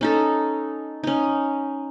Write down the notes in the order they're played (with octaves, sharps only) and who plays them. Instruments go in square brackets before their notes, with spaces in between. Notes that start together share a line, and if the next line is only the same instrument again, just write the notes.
[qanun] C#4 D#4 A4
C#4 D#4